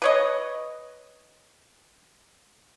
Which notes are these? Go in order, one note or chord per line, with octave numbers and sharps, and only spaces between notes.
B4 C#5 D#5